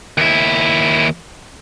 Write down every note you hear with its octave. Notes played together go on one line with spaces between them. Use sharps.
D#2 E4